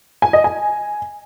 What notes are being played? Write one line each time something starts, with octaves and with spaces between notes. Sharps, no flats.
G#5
D#5
G#5